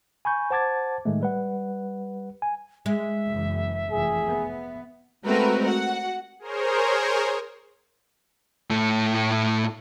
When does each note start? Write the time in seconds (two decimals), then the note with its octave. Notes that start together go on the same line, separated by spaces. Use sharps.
0.25 G#5 B5 C#6 G6
0.51 C5 F#5 A5 D6 G#6 A6
1.05 A2 D#3 G#3 A3
1.21 G3 B4 F#5
2.42 G#5
2.86 G#3 E5
3.28 F#1 F#2 E3
3.92 F1 E3 G#4
4.27 B3
5.25 G#3 A3 C4 F#4 A#4 B4
5.65 F#4 F#5
6.39 G#4 A#4 C5 C#5
8.70 A2 A3